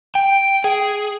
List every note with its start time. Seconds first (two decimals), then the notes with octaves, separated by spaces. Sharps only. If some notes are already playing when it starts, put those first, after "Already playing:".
0.15 G5
0.64 G#4